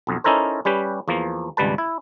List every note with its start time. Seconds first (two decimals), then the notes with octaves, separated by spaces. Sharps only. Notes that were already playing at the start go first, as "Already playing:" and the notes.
0.07 B1 F2
0.24 C#4 D#4 E4 A4 A#4 C5
0.65 G3 C#4 G4 B4
1.08 E2 F3 A#3
1.57 G#1 C#2 G3 B4 A5
1.78 E4